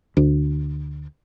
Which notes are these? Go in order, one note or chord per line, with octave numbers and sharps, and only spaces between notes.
D2